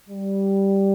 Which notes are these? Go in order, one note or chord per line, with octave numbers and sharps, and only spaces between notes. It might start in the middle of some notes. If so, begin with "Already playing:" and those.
G3